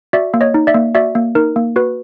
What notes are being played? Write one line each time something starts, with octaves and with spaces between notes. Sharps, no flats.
F#4 D5 E5
A#3
C#5 D#5
D#4
D5 E5
A#3
F#4 D5 E5
A#3
D#4 A#4
A#3
F#4 B4